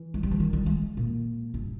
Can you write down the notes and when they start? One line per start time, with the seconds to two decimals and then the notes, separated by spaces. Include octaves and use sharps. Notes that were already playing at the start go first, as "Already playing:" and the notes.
Already playing: E3
0.14 G#3
0.23 G3
0.31 E3
0.40 D#3
0.53 G3
0.66 G#3
0.97 A#2
1.54 G2